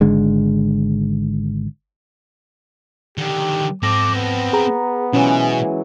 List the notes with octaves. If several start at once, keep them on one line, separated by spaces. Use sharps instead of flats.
G#1 D3 G#3
D3 D#3 G4
G#2 C4 A4 D6 A#6
B3
G#4 A#5
B2 E3 F#3 G#3 C#4